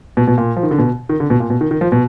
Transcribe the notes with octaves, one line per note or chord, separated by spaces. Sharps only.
B2
B2
A#2
F3
D#3
D3
B2
D#3
D3
B2
A#2
B2
D#3
D#3
F3
B2